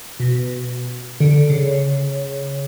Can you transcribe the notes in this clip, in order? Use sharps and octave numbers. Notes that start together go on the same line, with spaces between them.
B2
D3
C#3